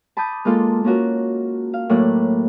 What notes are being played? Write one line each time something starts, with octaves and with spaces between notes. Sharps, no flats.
A5 B5 D6 D#6 G6
G#3 A#3 F4 A4
A#3 C#4 F4 F#4 A#4
F5
A2 F#3 A#3 D5 F#6